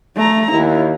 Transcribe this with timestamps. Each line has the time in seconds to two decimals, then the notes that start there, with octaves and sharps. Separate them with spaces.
0.16 A3 A#5
0.52 D#2 E4